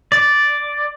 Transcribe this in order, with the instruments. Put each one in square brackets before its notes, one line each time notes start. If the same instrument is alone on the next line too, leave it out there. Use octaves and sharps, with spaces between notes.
[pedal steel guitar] D5